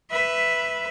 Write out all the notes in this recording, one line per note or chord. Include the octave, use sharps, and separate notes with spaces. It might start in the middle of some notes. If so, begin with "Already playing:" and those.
B4 E5